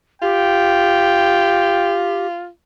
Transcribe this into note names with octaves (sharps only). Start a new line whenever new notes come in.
F4 G4 G5